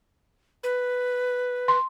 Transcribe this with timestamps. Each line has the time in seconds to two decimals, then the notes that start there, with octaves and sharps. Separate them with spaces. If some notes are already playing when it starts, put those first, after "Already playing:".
0.63 B4
1.68 C6